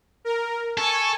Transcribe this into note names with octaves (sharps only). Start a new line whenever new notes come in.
A#4
A4 G#5 C#6